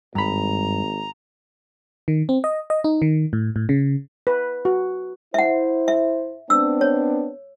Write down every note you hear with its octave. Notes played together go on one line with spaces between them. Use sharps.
G#1 G2 A#5 B5
D#3
C4
D#5
D#5
D#4
D#3
A2
A2
C#3
B4
F#4
E4 C5 E5 F#5
E5
B3 C4 D4 E6
C#5